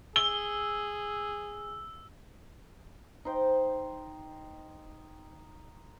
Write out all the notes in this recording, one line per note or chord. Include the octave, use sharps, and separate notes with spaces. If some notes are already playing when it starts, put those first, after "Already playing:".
G#4 E6 G7
D#4 C5 G5